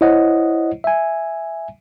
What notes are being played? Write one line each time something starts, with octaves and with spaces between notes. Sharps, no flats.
E4 C5 C#5 D#5 F#5
E5 G#5